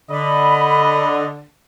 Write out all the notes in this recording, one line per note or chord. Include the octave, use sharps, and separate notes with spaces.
D3 D#5 B5